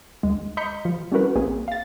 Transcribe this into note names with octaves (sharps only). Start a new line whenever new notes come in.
D#2 G#3
D#5 A#5 B5 G6 B6 C#7
F3
G3 C#4 E4 F#4 A#4 B4
A#1 A#3 C4 G#4
F5 A6